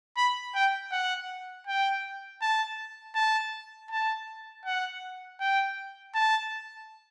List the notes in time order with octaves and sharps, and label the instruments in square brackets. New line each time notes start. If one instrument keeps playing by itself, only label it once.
[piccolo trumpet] B5
G5
F#5
G5
A5
A5
A5
F#5
G5
A5